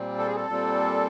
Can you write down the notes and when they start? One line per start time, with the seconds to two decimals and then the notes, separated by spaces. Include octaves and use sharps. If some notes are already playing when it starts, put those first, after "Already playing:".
Already playing: A#2 G3 C4
0.19 A4
0.28 G#4
0.36 A4
0.48 A#2 G3 C4